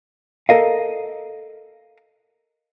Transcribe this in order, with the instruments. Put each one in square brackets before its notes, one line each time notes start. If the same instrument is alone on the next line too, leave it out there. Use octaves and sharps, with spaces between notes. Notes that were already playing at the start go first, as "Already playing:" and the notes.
[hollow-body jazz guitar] A4 A#4 D#5 F5